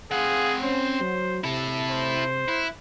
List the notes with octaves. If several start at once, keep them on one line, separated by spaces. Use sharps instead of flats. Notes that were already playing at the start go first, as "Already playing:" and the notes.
C4 G#4 F5 F#5
C#4 C5
F#3
C3 E4 A4
C5
E4 F#6